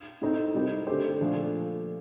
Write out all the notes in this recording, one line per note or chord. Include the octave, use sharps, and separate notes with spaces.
A2 A3 C4 D#4
C3 G3 C4 D#4 A#4
D3 A3 C4 G4 C5
A#2 F3 A3 D4